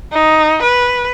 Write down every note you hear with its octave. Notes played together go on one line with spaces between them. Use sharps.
D#4
B4